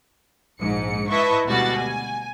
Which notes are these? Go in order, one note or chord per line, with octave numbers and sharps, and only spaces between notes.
A#1 G#2 C#7
E4 B4 D#5 E5 A5 C#6
G#1 D2 B2 G3 F#4 A6
G#5